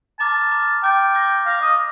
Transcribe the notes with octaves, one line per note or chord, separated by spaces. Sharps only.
A5 A#5 D6 F6 A6
A#5 D6 F6 A6
G5 A#5 D6 F6 A6
D6 G6 A#6
F5 D6 G6 A#6
D#5